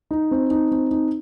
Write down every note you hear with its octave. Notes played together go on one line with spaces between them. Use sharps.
D#4
C4
D#4
C4
D#4